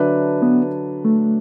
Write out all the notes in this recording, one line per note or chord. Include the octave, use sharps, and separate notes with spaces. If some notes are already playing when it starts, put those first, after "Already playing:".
Already playing: D3 F#3 D4 B4 E5
B3
A3